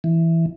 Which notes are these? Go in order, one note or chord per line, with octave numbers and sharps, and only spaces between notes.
E3